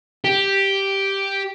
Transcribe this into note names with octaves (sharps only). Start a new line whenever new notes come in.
G4